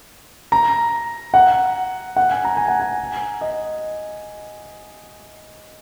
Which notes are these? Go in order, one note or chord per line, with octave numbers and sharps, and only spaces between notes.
A#5
F#5
F#5
G#5
A#5
G#5
F#5
G#5
D#5